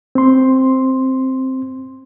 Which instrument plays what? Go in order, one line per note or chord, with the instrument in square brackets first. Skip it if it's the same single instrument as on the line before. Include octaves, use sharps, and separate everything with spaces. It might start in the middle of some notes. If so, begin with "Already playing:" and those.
[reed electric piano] C4 C6